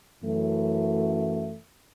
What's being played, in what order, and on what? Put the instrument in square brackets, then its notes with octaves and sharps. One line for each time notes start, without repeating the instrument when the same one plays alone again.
[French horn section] F#2 E3 A3